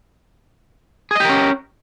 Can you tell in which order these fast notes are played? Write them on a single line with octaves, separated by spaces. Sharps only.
G#4 D#5 G4 A#4 C#4